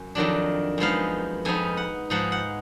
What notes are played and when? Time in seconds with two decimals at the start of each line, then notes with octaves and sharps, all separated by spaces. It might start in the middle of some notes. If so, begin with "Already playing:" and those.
Already playing: F#2
0.15 F2 D#3 F#3 D4
0.78 F#2 F3 G#3 B3 D#4 F5
1.45 F2 F3 B3 D#4 G#5
1.77 F#5
2.10 G#2 F3 G#3 D#4 F#5
2.32 F#5